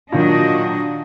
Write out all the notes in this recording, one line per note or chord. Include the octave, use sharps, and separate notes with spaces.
A#2 D#3 F#3 D4 F#4 D#5